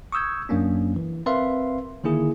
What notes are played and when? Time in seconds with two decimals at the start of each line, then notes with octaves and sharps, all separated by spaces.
0.12 C#6 D#6 E6 G6 G#6
0.49 F#2 F#3 A#3 C#4 D4
0.96 E3
1.26 C4 A#4 B4 E5 F5 C6
2.04 D3 D#3 A#3 E4 G#4